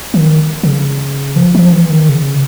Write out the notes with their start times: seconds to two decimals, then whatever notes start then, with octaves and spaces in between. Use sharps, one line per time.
0.14 D#3
0.63 C#3
1.36 F3
1.55 F3
1.72 E3
1.90 D#3
2.09 C#3